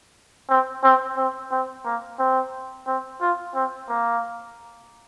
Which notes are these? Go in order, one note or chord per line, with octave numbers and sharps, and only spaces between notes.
C4
C4
C4
C4
A#3
C4
C4
F4
C4
A#3